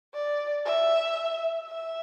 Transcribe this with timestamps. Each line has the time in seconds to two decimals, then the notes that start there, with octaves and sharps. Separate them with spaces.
0.14 D5
0.66 E5
1.69 E5